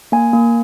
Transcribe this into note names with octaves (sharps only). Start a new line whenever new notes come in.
A#3 G#5
A#3